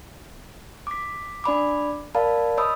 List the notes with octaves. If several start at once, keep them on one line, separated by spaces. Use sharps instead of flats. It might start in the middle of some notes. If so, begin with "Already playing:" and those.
D6 B6
D4 D5 B5 D6
A#4 D5 F5 A5 B5
C#5 D#5 B5 D#6 E6